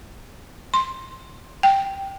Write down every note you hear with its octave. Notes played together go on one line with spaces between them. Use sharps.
C6
G5